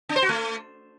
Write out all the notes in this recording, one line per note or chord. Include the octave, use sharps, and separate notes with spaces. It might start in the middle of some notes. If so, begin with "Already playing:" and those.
D4
C5
F#4
A3